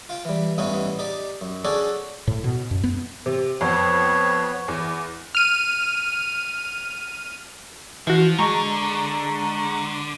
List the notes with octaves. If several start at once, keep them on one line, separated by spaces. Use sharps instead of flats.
F4 F5 G5
E3 G3
A1 G2 E3 B3 C#4 D#4
D#4 G4 D5
F#2
C#4 D4 F#4 G#4 A4 D5
A2
B2
F#2
B3
C3
F2 B3 C#5
E2
F6 D#7
E3 F3 F#4
D3 G#3 A#5 C#6